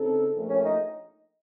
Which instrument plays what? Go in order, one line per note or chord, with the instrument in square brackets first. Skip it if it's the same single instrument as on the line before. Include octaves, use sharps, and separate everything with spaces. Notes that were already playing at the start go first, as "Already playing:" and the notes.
Already playing: [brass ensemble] C#3 C4 D#4 A4
A#1 A#2 A3
[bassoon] C#4
D#4